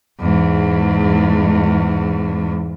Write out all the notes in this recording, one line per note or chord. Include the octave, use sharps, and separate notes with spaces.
E2 G#2